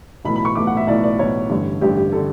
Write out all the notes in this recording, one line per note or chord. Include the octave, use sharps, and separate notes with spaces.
B1 A2 E3 B5
B5
C#6
B1 A2 E3 D6
F#5
E5
B1 A2 E3 D5
D5
B1 A2 E3 C#5
A1 G2 D3
A1 G2 D3 G4
G4
D3 A4